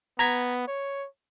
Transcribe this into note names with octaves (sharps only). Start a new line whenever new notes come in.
B3 A#5 G#6 B6
C#5